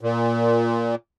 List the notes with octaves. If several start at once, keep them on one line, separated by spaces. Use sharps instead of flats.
A#2